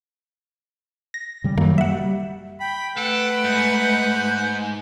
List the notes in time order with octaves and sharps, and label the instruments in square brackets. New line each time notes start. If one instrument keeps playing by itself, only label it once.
[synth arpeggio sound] A#6
[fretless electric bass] C#3 G3
[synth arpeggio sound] F#2 D#3 A#3 [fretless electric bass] F#3 G3
[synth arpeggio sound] E5 F#5
[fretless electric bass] G3
[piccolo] G5 [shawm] B5
[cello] A3 B4 [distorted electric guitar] A4 [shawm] F#5 [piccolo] D7
[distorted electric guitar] G#2 [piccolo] G6